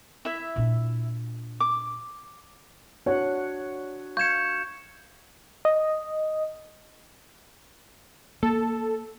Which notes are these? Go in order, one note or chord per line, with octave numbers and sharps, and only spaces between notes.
E4 E5
A#2 D4
D6
D4 F#4 C#5 F#5
F5 C#6 G6 G#6 C#7 E7
D#5
A#3 A4